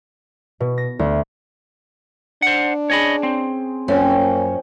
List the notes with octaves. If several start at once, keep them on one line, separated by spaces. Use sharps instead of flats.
B2
A#6
D2
D4 C5 F#5
C#4 G#4 C#5 D#5 B5
C4 C#5
F#2 F3 A#3 C#4 G5